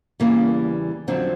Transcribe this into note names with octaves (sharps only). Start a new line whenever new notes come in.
E2 C#3 E3 G3 A#3
F2 D3 F#3 C4